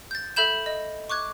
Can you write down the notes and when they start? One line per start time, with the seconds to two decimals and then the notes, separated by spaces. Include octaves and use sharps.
0.11 G6 A6
0.36 A4 E5 B5 G6 E7
0.66 D#5
1.10 C#6 D6 F#6 G#6